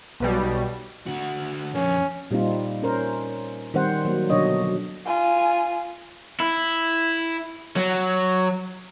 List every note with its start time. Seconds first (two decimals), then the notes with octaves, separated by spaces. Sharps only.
0.20 B1 B2 G3
1.06 D3 F#4
1.75 F2 A#3 C#4
2.31 A#2 G3 C4 D#4 F4
2.83 C#4 A#4 C5
3.74 D#3 G3 C4 C5 F#5
4.05 F#3 A#3
4.30 B2 D3 F#3 D4 C#5 D#5
4.62 F#3
5.06 F4 G#5
6.40 E4
7.77 F#3